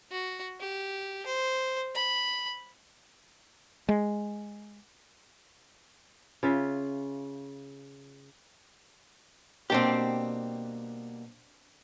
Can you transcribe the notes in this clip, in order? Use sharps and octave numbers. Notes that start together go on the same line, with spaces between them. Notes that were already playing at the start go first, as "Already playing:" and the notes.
F#4
G4
C5
B5
G#3
C#3 F4 E5
B2 G3 A#3 C4 D4 G4